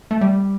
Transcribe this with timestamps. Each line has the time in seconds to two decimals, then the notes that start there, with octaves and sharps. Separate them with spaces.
0.11 A3
0.21 G3